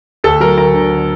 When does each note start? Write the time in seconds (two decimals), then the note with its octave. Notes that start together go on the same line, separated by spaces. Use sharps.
0.24 D2 A4
0.40 F#3 A#4
0.58 D2 A#4
0.74 D3